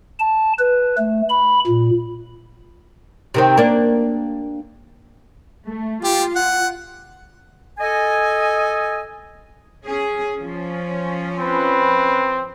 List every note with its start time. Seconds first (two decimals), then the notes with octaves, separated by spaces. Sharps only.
0.20 A5
0.59 B4
0.98 A3
1.29 B5
1.67 A#2
3.34 C3 D#3 C4
3.58 A#3 D4
5.67 A3
6.04 F4 G4
6.36 F#5
7.78 A4 D#5 G#5
9.86 C#4 G#4
10.38 F3 C#4
11.39 C4 B4